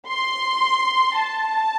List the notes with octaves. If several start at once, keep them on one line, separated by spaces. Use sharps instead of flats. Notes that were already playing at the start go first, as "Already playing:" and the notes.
C6
A5